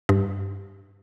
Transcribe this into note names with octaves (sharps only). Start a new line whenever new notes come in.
G2